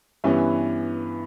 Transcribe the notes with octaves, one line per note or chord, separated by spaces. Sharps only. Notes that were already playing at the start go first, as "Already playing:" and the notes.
G2 E3 B3 C#4 E4